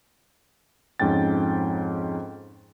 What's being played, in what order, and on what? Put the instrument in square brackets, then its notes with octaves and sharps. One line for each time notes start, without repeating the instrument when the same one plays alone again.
[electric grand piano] F2 G#2 C#4 G5 A6